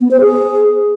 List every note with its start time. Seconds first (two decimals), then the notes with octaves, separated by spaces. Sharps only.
0.01 B3
0.11 C5
0.21 G#4